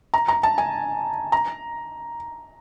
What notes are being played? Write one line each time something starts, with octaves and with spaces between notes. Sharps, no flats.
A#5
A#5
A5
G#5
A#5